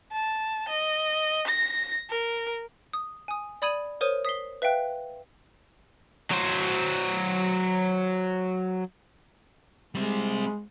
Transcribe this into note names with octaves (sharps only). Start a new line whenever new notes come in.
A5
D#5
A#6
A#4
D#6
G#5 D#6
D5 B5 D#6 G#6 D#7 F#7
A#4 C5 C#5 D#6 D#7
D#6 B6 C7 G7
B4 E5 F5 G5 F#6
F#3 C5
G3 G#3 C4